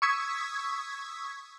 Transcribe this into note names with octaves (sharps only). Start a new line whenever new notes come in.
C#6 D#6 E6 G#6 B6